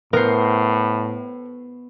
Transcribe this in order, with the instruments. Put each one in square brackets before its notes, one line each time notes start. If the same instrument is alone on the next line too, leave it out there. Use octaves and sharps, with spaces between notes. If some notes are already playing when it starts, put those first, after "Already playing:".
[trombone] A2 [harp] B3 C7 [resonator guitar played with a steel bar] A#4 C5